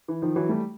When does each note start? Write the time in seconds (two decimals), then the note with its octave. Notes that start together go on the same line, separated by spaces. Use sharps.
0.08 E3
0.22 D#3 F3
0.36 E3 F#3
0.49 G3 A3